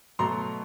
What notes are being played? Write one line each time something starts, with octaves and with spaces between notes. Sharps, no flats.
B2 F#3 A3 A#5 C6